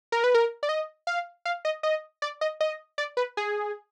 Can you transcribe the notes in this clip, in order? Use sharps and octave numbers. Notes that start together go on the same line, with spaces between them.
A#4
B4
A#4
D5
D#5
F5
F5
D#5
D#5
D5
D#5
D#5
D5
B4
G#4